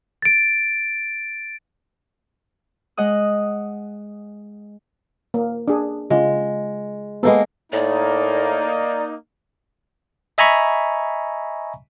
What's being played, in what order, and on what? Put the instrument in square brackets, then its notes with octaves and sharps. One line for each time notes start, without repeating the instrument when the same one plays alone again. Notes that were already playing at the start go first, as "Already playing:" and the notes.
[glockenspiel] A6 D7
[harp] G#3 D#5 F#5 D#6
[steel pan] A#3
D4 G#4
[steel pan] C#3 F4 [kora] G#3
[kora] G#3 A#3 A4 [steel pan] B3
[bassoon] A2 [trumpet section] A#3 D#4 [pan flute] D5
[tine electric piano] D#5 E5 G#5 A#5 B5 C#6